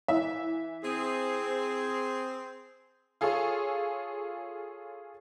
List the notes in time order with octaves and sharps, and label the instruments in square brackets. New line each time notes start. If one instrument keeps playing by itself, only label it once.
[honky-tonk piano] E3 E5
[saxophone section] C4 G#4
[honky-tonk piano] F4 G#4 A4 C#5